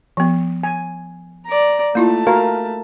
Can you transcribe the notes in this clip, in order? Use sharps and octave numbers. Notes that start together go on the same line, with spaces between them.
F3 B3
G#5
D5 A#5
A3 A#3 E4 F4 A5
F#4 A#4 F5